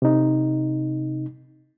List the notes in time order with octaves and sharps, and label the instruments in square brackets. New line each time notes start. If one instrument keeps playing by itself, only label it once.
[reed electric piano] C3 D#4